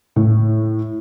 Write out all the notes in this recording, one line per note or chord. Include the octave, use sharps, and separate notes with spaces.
A2